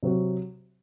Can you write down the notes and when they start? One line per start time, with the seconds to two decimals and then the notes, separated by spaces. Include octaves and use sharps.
0.03 C3 F#3 C4 F#4